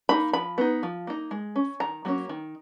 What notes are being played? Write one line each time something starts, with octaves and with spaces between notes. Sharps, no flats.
A#3 D#4 B5
F3 B5
B3 D#4
F3
A#3 D#4
G#3
C#4
D#3 A#5
F#3 A#3 C#4
D#3